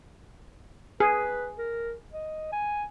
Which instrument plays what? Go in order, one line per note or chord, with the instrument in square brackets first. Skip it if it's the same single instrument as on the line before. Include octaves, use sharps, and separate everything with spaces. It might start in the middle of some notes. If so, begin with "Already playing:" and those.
[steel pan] G#4 [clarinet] B4
[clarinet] A#4
D#5
G#5